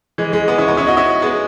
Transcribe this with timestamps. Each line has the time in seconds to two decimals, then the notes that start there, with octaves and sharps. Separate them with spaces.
0.18 E3 G#3
0.33 E3 G#3
0.47 G#3 B3
0.58 C#4 E4
0.68 B3 D#4
0.77 C#4 E4
0.87 D#4 F#4
0.97 C#4 E4
1.22 G#3 B3